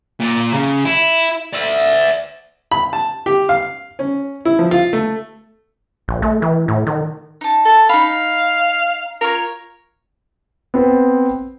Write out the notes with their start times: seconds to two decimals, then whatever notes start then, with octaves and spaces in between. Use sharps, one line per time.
0.20 A#2
0.54 C#3
0.85 E4
1.54 D5 E5
2.71 B5
2.93 A5
3.26 G4
3.49 F5
3.99 C#4
4.45 E4
4.59 F3
4.71 F4
4.93 A3
6.08 A#1
6.22 A3
6.42 E3
6.68 A2
6.87 D#3
7.41 D#4 A5
7.66 A4
7.89 D#4 F5 B5
9.21 F4 A#4 C#5
10.74 B3 C4 C5